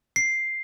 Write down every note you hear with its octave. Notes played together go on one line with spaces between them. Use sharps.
C7